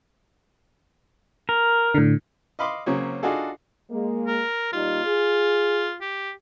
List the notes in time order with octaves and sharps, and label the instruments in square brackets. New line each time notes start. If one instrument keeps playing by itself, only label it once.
[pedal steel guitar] A#4
[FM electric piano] A2 D3
[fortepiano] D#5 F5 B5 C6 D6
C#3 F#3 A#3 C4 C#4
D4 D#4 F4 F#4 G#4 A4
[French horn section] G#3 A#3
[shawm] A#4
[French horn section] A#2 G3 D#4 [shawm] F4
[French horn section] G#4
[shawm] G4